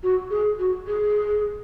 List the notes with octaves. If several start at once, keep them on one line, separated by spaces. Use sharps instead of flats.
F#4
G#4
F#4
G#4